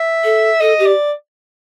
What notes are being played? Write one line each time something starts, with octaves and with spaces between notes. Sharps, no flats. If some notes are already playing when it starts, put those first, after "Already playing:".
Already playing: E5
A4
A4 D#5
G4
D5